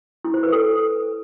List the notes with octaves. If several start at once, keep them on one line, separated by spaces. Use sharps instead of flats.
E4
C5
B4
A4